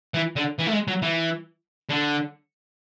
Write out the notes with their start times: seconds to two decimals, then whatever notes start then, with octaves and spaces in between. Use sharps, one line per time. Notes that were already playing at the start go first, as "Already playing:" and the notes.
0.14 E3
0.36 D3
0.59 E3
0.67 A3
0.73 G#3
0.88 F#3
1.02 E3
1.90 D3